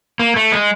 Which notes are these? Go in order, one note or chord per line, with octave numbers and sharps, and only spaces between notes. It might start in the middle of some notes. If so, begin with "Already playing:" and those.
A#3
A3
G#3